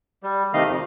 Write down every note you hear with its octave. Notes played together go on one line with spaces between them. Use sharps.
G3
C3 D#3 A3 D#5 F5 F6
F2